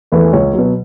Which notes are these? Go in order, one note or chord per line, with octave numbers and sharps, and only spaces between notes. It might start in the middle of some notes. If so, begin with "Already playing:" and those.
E2 E3 A3
C#2 C#5
B2 F#3